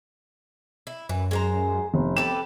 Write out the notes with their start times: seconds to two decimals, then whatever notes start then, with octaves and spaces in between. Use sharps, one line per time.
0.87 E4
1.09 F#2 E3
1.31 G#3 C5 A#5
1.94 F1
2.17 C4 G4 A4 B4 E7